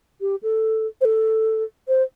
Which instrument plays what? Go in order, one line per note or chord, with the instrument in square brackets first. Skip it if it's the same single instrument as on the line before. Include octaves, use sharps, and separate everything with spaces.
[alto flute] G4
A4
C5
A4
C5